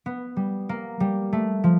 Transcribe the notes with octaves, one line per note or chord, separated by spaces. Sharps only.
B3
G3
A#3
G3
A3
F3